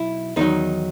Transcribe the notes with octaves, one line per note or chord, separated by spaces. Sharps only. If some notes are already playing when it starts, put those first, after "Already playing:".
Already playing: B1 B2 E4
E2 D#3 F#3 D#4